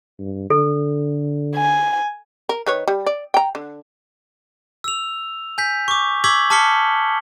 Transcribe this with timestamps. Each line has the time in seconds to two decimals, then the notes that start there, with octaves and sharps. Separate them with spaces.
0.20 G2
0.50 D3 A4
1.56 G#5
2.49 A#4
2.66 D#3 B4 C#5
2.88 G3
3.06 D5
3.34 G5 A#5
3.55 D3
4.84 E6 F7
5.58 G#5 G6 B6
5.88 C#6 D6
6.24 C#6 D6 E6 G#6 B6 F#7
6.50 A5 D6 F6 B6 C#7 G7